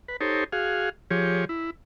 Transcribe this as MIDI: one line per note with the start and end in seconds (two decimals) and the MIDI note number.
0.08 0.17 71
0.21 0.44 63
0.21 0.44 67
0.21 0.44 69
0.21 0.44 72
0.21 0.44 73
0.52 0.89 66
0.52 0.89 68
0.52 0.89 77
1.11 1.45 53
1.11 1.45 67
1.11 1.45 68
1.11 1.45 73
1.49 1.70 64